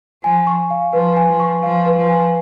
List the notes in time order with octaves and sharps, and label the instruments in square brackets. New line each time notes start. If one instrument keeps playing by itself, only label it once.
[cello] F3 [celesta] G#5
[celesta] C#6
F5
[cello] F3 [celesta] B4
[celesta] G#5
[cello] F3
[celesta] C#6
[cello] F3 [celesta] F5
[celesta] B4
[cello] F3
[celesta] G#5